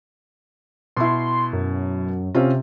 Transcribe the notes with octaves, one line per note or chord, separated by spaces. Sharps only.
B2 E4 C6
F#2
C3 C4 C#4 F4